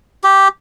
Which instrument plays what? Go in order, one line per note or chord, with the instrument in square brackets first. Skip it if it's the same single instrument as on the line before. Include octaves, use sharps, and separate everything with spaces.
[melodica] G4